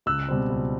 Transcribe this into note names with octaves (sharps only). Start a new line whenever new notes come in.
C#2 E6 F#6
B2 G3 C4
C#2